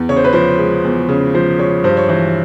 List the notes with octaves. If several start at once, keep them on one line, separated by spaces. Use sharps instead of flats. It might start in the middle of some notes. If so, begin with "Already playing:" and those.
Already playing: E2
C#3 C#5
C5
B4
F3 C5
G#3
E2
C#3
F3 C5
G#3 C#5
G2 C5
C#5
E3 C5